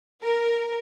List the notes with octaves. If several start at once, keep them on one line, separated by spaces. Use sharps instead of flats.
A#4